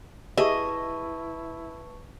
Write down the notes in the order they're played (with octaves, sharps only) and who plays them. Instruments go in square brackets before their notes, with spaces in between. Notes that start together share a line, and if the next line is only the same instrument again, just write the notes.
[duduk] E4 [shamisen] G4 G#4 E5 [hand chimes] B4 A5 C#6 [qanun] D#5